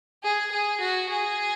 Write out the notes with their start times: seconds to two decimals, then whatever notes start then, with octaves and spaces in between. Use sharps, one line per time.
0.23 G#4
0.52 G#4
0.81 F#4
1.09 G#4